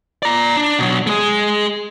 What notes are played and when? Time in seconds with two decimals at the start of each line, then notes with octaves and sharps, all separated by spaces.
0.23 D5 A#5
0.57 D4
0.79 B2 F#3
1.07 G#3 G#4